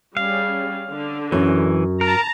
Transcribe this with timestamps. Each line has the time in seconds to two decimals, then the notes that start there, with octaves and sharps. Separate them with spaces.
0.17 G3 C#4 G#4 F5
0.91 D3
1.32 F#2 E3
2.01 A#4 A5 A#5